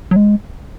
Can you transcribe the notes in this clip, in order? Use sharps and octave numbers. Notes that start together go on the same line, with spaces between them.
F#3
G#3